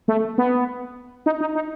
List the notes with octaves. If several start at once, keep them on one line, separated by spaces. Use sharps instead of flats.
A3
B3
D#4
D#4
D#4